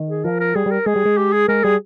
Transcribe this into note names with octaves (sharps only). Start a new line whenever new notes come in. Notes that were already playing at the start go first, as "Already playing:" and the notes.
Already playing: D#3
G#4
F3 A#4
A#4
G3 G#4
G3 A#4
G#3 G#4
G3
G#3
G4
G#4
G#3 A#4
G3 G#4